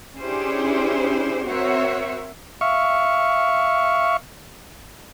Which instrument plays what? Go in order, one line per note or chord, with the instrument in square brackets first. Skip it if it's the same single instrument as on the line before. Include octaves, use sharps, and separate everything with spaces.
[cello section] C#4 D4 E4 G4 G#4 C5
C4 F#4 A#4 C5 C#5 E5
[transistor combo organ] E5 F5 C#6